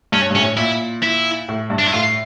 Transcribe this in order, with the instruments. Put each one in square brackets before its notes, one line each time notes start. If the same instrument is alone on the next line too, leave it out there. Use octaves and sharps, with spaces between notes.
[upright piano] G2 [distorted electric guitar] C#4
[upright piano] G2
[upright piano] A2 [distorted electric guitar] C#4
[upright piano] A#2 [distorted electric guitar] E4
[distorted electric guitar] E4
[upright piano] A2
G2
[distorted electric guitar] D4
E4
[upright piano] A2 [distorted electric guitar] F4